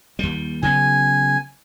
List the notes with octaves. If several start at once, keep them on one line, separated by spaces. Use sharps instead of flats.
D#2 G3
C#3 F#3 B3 G#5